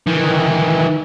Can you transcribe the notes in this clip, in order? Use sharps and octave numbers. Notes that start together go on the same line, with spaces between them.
D#3 E3